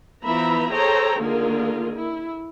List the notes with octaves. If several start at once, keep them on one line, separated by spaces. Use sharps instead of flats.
E3 F3 B3 E5 A#5 B5
G#4 A4 C5 C#5 G5 A#5
D3 D#3 A#3 F4 G#4 A#4
E4